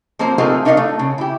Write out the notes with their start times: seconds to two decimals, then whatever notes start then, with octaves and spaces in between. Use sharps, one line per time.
0.19 F3 A#3 C4 A#4 C5
0.38 A3 C4 D#4 F4 G#4 A#4
0.65 D4 D#4 A#4 D#5 F5 F#5
0.77 A3
0.99 C#3
1.18 E4 G4